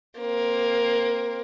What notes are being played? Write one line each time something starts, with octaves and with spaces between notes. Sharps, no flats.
A#3 C4